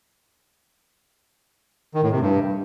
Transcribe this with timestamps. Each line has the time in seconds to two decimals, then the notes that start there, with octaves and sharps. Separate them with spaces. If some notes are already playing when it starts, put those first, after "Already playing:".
1.94 D#3
2.03 A2
2.12 C3
2.21 G2